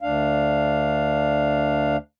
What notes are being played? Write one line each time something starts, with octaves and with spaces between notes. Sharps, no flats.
D2 D4 F5